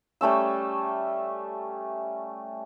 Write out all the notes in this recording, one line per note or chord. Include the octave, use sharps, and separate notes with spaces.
G3 A3 C#4 E6